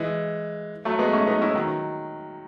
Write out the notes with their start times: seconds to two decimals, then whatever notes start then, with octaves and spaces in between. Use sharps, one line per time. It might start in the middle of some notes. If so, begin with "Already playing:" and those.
Already playing: E3 G#3
0.85 F#3 A3
0.99 G#3 B3
1.13 A3 C#4
1.27 B3 D#4
1.41 C#4 E4
1.55 D#3 F#3